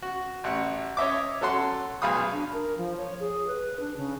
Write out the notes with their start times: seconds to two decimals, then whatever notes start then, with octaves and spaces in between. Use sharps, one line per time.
0.02 F#4
0.44 A1 F#5
0.97 C#5 D#5 E5 D6
1.41 F#3 C#4 A4 F#5 C6
2.02 B1 G#4 F5 B5 D#6
2.32 D4
2.53 A#4
2.78 F3
2.97 C#5
3.20 G#4
3.47 B4
3.80 D4
3.97 C#3